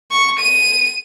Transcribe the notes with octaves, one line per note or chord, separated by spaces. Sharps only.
C#6
D#7